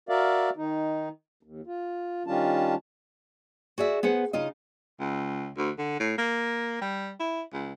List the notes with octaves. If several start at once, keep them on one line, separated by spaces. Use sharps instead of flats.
F#4 A#4 D5 E5 F5
D#3 D#4
D#2
F4
D#3 G3 C#4 D4 F4 A5
F#4 G#4 D5 E5
B3 G#4 C5 F#5
C#3 D#4 F4 D#5
C#2
D2
D3
A2
A#3
G3
E4
C#2